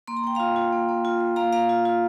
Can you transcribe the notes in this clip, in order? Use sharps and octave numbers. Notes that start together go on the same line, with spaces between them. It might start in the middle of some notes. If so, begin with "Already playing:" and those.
A#3 C6
A#5
A#3 G5
F4 F5 A#5
F4
A#3
A#3
F4
F4
A#3 F5 A#5
A#3 F5 A#5
F4
F4